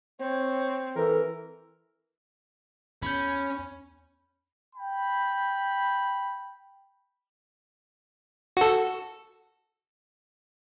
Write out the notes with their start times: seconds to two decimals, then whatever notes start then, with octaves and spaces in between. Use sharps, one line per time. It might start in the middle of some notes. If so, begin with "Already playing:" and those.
0.20 C4 C#5
0.96 E3 A4 A#4
3.02 E2 C#4 B5 G6
4.76 G5 B5
8.57 F#4 A4